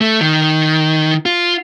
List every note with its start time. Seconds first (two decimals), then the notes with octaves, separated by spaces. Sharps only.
0.01 A3
0.21 D#3
1.26 F4